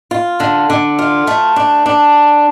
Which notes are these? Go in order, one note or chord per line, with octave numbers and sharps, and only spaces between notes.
F4
D3
D3
F4
A3
D4
D4